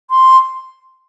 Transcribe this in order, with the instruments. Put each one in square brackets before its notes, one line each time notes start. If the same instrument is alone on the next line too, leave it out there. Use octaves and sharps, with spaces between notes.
[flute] C6